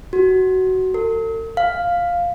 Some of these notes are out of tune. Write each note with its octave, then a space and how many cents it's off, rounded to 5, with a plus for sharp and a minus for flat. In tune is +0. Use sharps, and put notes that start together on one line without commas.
F#4 +15
A4 +45
F5 +0